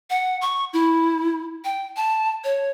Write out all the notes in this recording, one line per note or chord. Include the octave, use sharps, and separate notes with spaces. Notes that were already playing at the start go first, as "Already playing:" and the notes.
F#5
C#6
E4
G5
A5
C#5